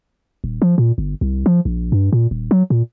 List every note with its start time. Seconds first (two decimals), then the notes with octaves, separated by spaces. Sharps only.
0.44 D#1
0.62 F3
0.78 A#2
0.98 G1
1.21 C2
1.46 F3
1.65 A#1
1.92 G2
2.12 A#2
2.31 D#1
2.51 F#3
2.70 A#2